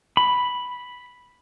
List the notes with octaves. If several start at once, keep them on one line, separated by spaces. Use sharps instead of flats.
B5